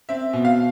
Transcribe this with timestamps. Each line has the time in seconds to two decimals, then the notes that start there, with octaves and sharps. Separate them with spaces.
0.09 C4 E5
0.33 B2
0.45 F5